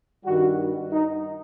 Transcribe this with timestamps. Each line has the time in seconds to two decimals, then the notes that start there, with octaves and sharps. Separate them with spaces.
0.25 G2 D#3 G3 F#4
0.93 D#4